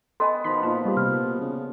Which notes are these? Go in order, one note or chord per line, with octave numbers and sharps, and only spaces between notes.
B3 A4 D#5 G5 G#5 C6
B2 D#3 F3 B5 B6
A#2 D#4 F4 A5
G3 F4 G4
C3 F6
C#3